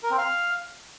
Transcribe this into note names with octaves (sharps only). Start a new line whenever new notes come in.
A#4
C4
F5